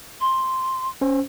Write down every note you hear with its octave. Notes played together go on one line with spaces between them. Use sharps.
C6
C#4 C5